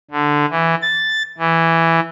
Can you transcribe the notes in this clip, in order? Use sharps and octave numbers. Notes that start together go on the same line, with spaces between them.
D3
E3
A6
E3